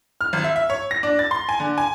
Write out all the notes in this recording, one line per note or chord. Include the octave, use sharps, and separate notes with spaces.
F6
G#1
E5
E5
C#5
A#6
D4
A6
C6
G#5
D3
G#5